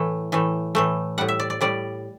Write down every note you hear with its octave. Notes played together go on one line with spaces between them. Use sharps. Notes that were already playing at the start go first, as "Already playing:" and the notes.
Already playing: A2 E3 A3
A2 E3 A3
A2 E3 A3
A2 G3 F#5
E5
D5
D5
A2 G3 D5